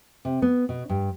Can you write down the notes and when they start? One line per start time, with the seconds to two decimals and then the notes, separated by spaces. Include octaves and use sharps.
0.25 C3
0.42 B3
0.69 B2
0.89 G2